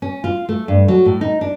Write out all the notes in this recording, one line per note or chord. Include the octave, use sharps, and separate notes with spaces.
C#4
F4
A3
G2
F#3
A2
D#4
D4